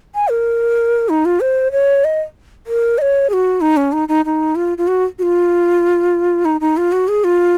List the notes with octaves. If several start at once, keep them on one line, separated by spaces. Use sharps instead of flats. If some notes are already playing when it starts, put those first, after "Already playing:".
G#5
A#4
D#4
F4
C5
C#5
D#5
A#4
D#5
C#5
G#4
F#4
D#4
C#4
D#4
D#4
D#4
F4
F4
F#4
F#4
F4
D#4
D#4
F4
F#4
G#4
F4